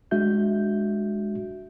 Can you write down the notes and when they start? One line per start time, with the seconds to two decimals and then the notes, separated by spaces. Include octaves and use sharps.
0.11 G#3 D4 F#4 E5 G6